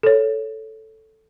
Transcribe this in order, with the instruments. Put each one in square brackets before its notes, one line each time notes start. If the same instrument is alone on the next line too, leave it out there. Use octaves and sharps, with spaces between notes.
[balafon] A4 C#5